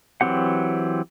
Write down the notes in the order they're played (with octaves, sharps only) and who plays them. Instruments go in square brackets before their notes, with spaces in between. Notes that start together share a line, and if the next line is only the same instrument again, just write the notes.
[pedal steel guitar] E3 F#3 C4 G4 F#5